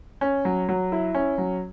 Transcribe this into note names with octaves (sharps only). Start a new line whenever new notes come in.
C#4
F#3
F#3
E4
C#4
F#3